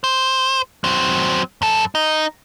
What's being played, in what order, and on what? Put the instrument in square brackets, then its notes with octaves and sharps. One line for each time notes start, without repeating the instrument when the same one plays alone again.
[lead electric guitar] C5
F#3 C4
F#2 A4
D#4